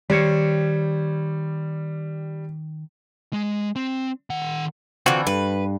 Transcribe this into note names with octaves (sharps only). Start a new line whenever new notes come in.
D#3 G3 C5 C#5
G#3
C4
D#3 F#5
D3 E3 C4 F4 F#4
G2 B4